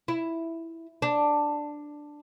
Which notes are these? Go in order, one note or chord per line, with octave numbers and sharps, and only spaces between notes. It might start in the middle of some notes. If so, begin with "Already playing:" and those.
E4
D4